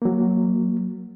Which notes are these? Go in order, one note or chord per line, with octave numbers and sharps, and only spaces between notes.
F#3 A#3